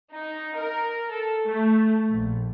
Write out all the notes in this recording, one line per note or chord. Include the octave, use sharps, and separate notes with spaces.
D#4
A#4
A4
A3
A#1